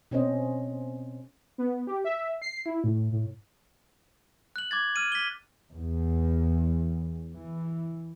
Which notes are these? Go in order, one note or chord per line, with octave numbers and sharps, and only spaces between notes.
B2 C4 C#4 A4 C5 D#5
B3
G4
E5
C7
E4
A2
A2
F#6 F#7
D6 G#6 A6
F6 D#7
B6 G7
E2
E3